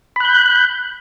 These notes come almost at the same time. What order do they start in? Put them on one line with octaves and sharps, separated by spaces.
B5 F#6 G6